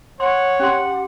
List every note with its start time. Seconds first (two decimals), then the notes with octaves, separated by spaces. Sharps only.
0.20 C#5 F#5 C6
0.59 C#4 G4 F#5 C6